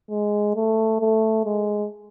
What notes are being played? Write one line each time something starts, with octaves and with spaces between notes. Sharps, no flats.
G#3
A3
A3
G#3